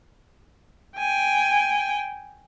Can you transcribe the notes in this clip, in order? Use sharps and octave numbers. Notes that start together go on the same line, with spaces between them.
G5 G#5